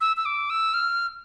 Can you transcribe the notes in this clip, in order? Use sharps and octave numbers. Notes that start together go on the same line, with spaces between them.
E6
E6
D6
E6
F6